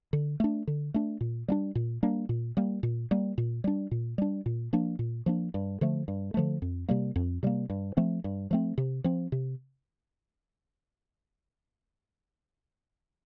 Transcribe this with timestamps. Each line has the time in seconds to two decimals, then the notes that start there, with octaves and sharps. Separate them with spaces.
0.13 D3
0.40 A3 D4
0.67 D3
0.94 A3 D4
1.21 A#2
1.48 G3 A#3 D4
1.75 A#2
2.03 G3 A#3 D4
2.29 A#2
2.57 G3 A#3
2.83 A#2
3.11 G3 A#3
3.38 A#2
3.64 G3 D4
3.91 A#2
4.18 G3 D4
4.46 A#2
4.73 F3 A#3 D4
4.99 A#2
5.26 F3 A#3 D4
5.54 G2
5.81 D3 F3 A3
6.08 G2
6.34 D3 F3 A3
6.62 F2
6.89 C3 G3 A#3
7.16 F2
7.43 C3 G3 A#3
7.70 G2
7.97 F3 A3 C4
8.24 G2
8.51 F3 A3 C4
8.78 C3
9.04 F3 C4
9.32 C3